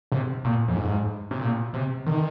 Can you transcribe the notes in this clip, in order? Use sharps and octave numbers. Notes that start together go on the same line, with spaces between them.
C3
A#2
F2
G#2
C3
A#2
C3
D#3